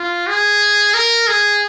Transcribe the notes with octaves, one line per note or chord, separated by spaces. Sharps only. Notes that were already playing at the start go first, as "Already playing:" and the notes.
Already playing: F4
G#4
A#4
G#4